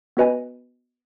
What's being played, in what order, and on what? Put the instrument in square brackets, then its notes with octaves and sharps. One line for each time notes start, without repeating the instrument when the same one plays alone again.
[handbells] B3 F#4 B4 D#5 G#5